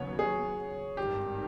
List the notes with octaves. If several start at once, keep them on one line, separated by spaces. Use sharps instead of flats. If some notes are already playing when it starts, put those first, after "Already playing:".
Already playing: D#2 C#3 F#3 B3 C#5
G#4
G#1 G2 D#3 G4